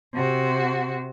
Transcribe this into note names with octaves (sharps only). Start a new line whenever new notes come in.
C3 F#4